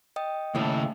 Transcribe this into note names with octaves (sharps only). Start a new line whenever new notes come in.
D#5 G5 D#6
D#2 A2 C#3 A5